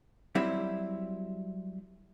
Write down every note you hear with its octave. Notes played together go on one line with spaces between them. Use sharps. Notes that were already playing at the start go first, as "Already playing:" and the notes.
F#3 G3 C4 E4